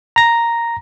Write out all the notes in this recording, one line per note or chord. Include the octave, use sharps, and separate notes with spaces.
A#5 A#6